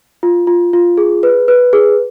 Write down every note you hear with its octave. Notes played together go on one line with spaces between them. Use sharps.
F4
F4
F4
G#4
B4
B4
G#4